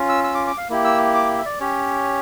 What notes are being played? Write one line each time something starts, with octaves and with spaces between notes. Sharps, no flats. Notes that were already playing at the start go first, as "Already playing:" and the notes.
Already playing: C#4 F4
E6
E6
D6
D6
F5
A#3 E4 G4
E6
D6
E5
D5
C#4 G4 C#5